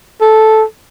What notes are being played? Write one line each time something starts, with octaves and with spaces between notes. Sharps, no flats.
A4